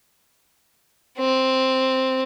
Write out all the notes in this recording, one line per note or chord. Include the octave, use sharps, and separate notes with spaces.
C4